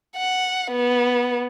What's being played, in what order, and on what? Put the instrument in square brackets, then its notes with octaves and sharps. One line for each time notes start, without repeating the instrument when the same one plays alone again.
[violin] F#5
B3